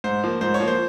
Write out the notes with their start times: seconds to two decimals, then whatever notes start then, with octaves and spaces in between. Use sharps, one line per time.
0.04 G#2 C5
0.24 F3 A#3
0.41 G#2 C5
0.54 C#5
0.60 F3 A#3
0.68 C5